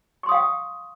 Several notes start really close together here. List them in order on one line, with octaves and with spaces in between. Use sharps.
C#6 C6 D#6 F5 G5